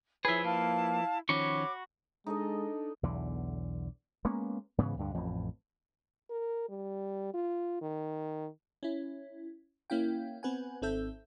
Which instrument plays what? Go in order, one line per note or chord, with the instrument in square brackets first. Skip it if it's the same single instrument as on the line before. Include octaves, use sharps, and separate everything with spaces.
[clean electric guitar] F3 B4 [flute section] E4 C#5 [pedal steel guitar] G#4 E5
[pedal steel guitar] A#3 [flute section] E4 F5 A5
[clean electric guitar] D#3 F3 C#4 [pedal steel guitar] F#4 B5 C#6 [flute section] C#5 D6
[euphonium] G#3 [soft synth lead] D4 [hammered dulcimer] D#4 A4 D#5
[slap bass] B1 E2 D3
G#3 A#3 B3 C#4
G#2 C#3 E3 B3
D2 G2 D3
A1 F2 A2
[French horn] A#4
G3
F4
D#3
[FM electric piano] C#4 E4
A#3 C#4 E4 F5 G5
B3 C4 B4 F#5 G#5
G#1 C4 A4 E5 G6